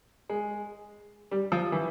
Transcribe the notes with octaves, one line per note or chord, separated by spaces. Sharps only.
G#3
G3
F3
E3